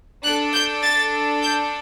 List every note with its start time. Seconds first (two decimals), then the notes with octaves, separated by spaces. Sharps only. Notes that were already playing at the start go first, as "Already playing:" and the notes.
0.23 D4 A4 F#6
0.53 G6
0.83 A6
1.42 G6